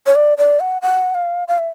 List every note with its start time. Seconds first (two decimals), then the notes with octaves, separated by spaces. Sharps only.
0.06 C#5
0.15 D5
0.38 D5
0.60 F#5
0.82 F#5
1.15 F5
1.48 F5
1.58 E5